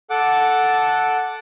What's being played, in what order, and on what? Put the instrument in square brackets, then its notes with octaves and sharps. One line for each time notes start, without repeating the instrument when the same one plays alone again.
[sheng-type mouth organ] A4 F#5 D6